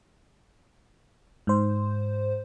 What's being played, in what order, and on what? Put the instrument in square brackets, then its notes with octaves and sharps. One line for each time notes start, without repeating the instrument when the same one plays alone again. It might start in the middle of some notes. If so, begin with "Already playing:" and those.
[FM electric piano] G#2 C5